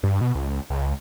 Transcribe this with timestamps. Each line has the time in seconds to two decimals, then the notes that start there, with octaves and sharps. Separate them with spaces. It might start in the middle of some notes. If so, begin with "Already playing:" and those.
0.03 G2
0.21 B2
0.35 C#2
0.70 C#2